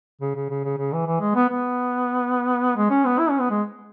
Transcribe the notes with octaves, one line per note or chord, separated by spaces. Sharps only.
C#3
C#3
C#3
C#3
C#3
E3
E3
G#3
B3
B3
G#3
C#4
B3
E4
C#4
B3
G#3